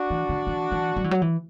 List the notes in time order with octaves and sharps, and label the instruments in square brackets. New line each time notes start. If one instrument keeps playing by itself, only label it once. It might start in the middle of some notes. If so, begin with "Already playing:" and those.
Already playing: [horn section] D4 F#4
[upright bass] E3
D3
E3
E3
F#3
E3
F#3
E3